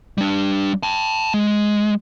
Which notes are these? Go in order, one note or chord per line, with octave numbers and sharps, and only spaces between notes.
G3 D4
G5 A5
G#3